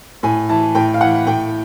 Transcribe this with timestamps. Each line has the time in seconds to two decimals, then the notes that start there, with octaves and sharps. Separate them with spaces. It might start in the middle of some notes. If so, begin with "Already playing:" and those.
0.23 A2 G#5
0.49 E3 A5
0.75 A2 G5
0.94 F5
1.01 E3 F#5
1.27 A2 G5